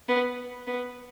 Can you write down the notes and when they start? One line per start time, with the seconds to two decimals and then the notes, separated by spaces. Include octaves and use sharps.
0.09 B3
0.67 B3